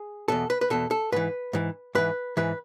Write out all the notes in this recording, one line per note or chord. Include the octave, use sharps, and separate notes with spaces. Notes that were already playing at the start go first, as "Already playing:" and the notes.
Already playing: G#4
E2 B2 A4
B4
B4
E2 B2 A4
A4
G#2 E3 B4
G#2 E3
G#2 E3 B4
G#2 E3 B4